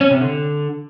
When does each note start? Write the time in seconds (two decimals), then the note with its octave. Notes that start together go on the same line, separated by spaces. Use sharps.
0.01 C#4
0.11 C3
0.21 D3